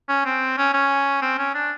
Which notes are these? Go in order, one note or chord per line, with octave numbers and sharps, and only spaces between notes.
C#4
C4
C#4
C#4
C4
C#4
D4